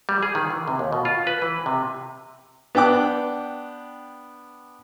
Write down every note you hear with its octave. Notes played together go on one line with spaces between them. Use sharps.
G3
G#4
D#3
E3
C3
D#2
B2
F4
B4
E3
C3
B3 D4 G5 D6